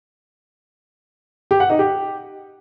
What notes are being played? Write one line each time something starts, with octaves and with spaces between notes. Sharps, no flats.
G4
F#5
D#4
G4